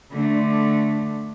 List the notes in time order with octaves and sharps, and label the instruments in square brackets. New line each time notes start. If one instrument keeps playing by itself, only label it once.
[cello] D3 A3